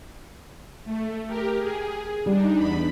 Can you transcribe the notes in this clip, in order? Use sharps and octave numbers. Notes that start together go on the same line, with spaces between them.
A3
G4 A#4
G#4
G3 D4 D#4
E2 B5